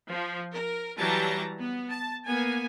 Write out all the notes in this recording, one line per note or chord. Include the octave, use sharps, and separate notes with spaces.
F3
A#4
E3 F#3 G3 G4 A5 A#5
B3
A5
A#3 B3 G#5